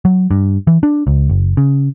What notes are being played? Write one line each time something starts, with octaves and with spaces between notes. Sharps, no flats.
F#3
G2
E3
D4
C#2
F#1
C#3